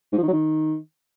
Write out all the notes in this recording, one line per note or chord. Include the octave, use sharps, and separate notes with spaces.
G#2
F3
D#3
F#3
D#3